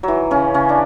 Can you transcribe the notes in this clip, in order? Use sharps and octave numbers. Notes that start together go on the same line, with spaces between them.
E3 F#3
C#3 C#4
C#3 C#4
D4